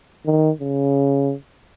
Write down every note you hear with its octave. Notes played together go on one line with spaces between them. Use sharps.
D#3
C#3